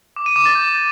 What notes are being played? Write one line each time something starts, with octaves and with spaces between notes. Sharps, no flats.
D6
D#7
D6
A6
G6